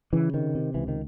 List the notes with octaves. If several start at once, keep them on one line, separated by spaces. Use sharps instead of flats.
C#3 E3
C3 D#3
C3
C#2 E3
D#3